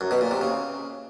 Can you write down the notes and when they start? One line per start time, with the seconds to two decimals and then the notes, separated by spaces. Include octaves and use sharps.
0.01 F#2
0.11 B2
0.21 A#2
0.31 C3
0.41 C#3